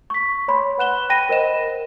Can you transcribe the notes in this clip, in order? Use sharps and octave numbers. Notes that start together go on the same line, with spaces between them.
C#6 B6
C#5 B5 C6
B4 F#5 F#6 E7 G7
G5 B5 A#6 D#7
A#4 C5 D#5 E7